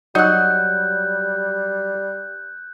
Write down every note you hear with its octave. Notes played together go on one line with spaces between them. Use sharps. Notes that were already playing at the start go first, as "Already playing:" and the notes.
F#3 G3 D#4 F#5 F#6 G6